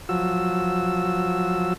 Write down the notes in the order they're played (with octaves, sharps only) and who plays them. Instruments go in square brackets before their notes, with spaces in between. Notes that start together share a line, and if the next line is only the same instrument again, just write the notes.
[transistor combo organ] F3 F#3 E6